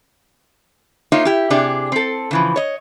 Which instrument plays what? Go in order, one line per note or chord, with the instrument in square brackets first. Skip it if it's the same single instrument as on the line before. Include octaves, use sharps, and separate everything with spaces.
[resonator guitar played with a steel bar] A#3 D#4 F4 C#5 E5
E4 G4
C3 D4 G4 G#4 D5
C4 A4
C#3 E3 F3
C#5 D#5